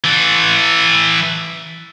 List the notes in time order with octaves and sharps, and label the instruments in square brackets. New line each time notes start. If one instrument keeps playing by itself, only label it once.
[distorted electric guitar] E3 A4